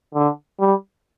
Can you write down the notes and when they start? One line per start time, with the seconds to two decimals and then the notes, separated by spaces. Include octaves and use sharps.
0.15 D3
0.60 G3